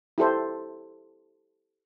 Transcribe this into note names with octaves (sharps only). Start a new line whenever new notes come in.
E4 G4 A4 C5